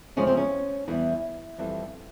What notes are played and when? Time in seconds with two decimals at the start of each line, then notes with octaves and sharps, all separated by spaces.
0.17 E2 C#3 F3 G#3 C#4
0.27 C4
0.37 C#4
0.88 E2 E3 G3 E4
1.58 F2 E3 G3